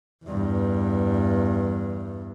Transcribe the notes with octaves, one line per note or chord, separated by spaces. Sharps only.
E2 G2